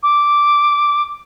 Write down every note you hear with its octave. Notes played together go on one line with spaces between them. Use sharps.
D6